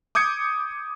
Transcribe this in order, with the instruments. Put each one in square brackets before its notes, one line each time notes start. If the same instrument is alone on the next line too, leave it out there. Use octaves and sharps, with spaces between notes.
[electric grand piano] D6 D#6 G6 G#6 C#7